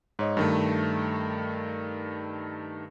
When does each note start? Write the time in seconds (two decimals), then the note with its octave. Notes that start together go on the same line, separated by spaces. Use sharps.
0.19 G#2 C#5 D#5
0.37 G2 D#3 A3